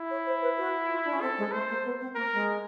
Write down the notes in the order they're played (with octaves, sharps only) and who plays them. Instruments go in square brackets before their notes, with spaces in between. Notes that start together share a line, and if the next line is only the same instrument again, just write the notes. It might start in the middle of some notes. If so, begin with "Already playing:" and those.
Already playing: [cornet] E4
[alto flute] C#5
C5
B4
F#4
F4
D4
C#4
[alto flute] C4 [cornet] A4
[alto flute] G#3
[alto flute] A3 [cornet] C5
[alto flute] A#3
B3
C4
[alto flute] A#3 [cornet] A#4
[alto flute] G#3